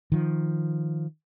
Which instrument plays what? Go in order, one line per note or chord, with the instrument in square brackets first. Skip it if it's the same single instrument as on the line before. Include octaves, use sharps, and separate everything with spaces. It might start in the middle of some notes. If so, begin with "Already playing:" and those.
[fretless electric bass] D#3 F3